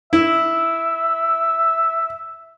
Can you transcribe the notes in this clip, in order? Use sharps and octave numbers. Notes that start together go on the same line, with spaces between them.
E4 E5